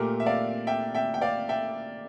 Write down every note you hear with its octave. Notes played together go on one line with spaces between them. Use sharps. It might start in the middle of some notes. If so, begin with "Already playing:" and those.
Already playing: A#2 A3 G4 A#4
E5
D5 F5
E5 G5
E5 G5
G5
D5 F5
E5 G5